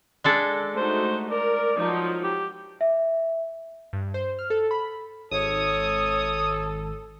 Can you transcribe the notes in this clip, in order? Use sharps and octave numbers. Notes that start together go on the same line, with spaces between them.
G#3 D4 A4
A3 D#4 F#4 C5
A#4 D5
F3 F#3 D#4
G4
E5
G2
C5
F6
A4
B5
G#1 A4 C#5 D#6